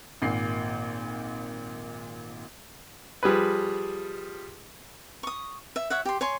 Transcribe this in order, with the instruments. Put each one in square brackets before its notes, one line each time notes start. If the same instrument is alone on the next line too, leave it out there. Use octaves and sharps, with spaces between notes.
[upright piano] G#1 A#2 C7
[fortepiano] F3 G3 G#4 B4
[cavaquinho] C#6 D#6
E5
C#5 E5 F#5
G4 C6
C#5 G#5 C6